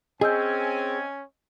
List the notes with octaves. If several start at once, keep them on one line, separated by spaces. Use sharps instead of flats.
C4 C#4 G#4 D#5 G#5 E6 G6